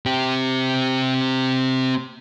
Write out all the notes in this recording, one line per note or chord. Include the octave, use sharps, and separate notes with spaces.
C4 G4